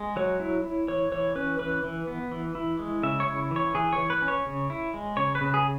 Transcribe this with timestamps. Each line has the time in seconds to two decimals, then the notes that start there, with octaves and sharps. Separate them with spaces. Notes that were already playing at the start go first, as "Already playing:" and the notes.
Already playing: G#3
0.16 F#3 C#5
0.40 E4
0.64 E4
0.88 E3 C#5
1.12 E3 C#5
1.35 C#4 B4
1.59 E3 B4
1.84 E3
2.07 B3
2.32 E3
2.55 E4
2.79 G#3
3.03 C#3 E5
3.20 C#5
3.27 E4
3.51 E3
3.56 C#5
3.75 E3 G#4
3.93 C#5
3.98 E3
4.10 B4
4.22 C#4
4.28 C#5
4.46 C#3
4.70 E4
4.94 G#3
5.17 C#3 C#5
5.35 B4
5.41 C#3
5.54 G#4